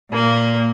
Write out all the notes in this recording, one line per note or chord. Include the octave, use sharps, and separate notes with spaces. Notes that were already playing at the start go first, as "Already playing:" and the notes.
A#2 A#3